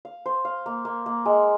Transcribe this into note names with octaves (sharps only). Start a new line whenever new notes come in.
F5
C5
F5
A#3
A#3
A#3
G#3